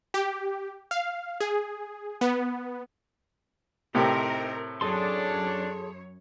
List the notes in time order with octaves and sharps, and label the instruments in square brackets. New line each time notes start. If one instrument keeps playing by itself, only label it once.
[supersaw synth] G4
F5
G#4
B3
[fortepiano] A2 C3 G5 [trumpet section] C4 D#4 [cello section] A#4
[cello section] F#2 C#5 [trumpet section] D4 [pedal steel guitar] G#4 A4 C6